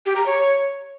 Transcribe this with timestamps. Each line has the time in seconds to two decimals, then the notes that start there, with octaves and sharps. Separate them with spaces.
0.06 G4
0.16 A#5
0.26 C#5